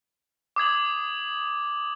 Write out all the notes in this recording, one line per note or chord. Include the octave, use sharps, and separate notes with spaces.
D6 D#6 G#6 F#7